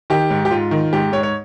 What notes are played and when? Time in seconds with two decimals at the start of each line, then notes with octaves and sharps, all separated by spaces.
0.10 D#3 G4
0.30 G#2
0.45 G4
0.51 G#2 F4
0.71 D#3
0.93 G#2 G4
1.12 G#2 C#5
1.23 C#5